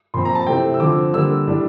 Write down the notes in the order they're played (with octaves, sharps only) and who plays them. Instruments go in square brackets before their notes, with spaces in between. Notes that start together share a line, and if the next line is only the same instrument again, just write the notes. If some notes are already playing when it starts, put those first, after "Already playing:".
[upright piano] A#2 F3 C4 C6
A#5
A5
C3 E3 A3 C4 G5
E6
D3 F3 C4 D6
D3 G3 A#3 E6
A2 G3 D4